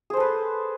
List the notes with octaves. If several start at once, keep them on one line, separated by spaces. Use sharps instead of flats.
G#4 A4 B4 C5